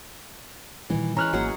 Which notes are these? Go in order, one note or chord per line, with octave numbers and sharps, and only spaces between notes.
A#2 D#3 E3 G3
E3 G#3 C#4 A#5 F6 F#6
G#1 F#3 A#3 G#4 F#5